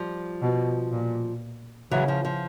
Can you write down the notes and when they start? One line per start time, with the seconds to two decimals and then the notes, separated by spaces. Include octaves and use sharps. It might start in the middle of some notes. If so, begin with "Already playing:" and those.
Already playing: F3 G3
0.42 B2
0.92 A#2
1.91 C#3 E3 F#3
2.08 F3
2.25 F3